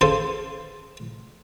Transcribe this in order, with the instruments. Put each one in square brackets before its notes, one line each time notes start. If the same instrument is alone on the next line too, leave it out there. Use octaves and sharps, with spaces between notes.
[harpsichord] C#3 A4 C5 D#6